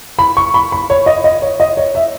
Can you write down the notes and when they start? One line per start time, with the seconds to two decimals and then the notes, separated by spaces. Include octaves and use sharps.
0.19 B5
0.37 C#6
0.54 B5
0.72 B5
0.90 C#5
1.06 D#5
1.24 D#5
1.42 C#5
1.60 D#5
1.77 C#5
1.95 E5